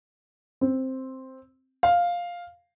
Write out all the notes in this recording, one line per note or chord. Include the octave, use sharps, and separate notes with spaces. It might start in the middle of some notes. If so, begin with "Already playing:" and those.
C4
F5